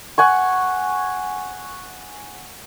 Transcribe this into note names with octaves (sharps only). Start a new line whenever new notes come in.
F#5 G#5 C#6